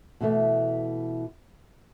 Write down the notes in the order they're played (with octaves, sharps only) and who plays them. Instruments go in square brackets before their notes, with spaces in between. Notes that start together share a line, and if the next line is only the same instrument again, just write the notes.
[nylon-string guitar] B2 E3 A3